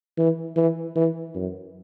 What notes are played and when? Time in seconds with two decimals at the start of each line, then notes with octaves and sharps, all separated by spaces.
0.18 E3
0.57 E3
0.96 E3
1.35 F#2